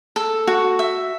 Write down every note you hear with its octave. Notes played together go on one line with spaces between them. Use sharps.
A4
F#4
E5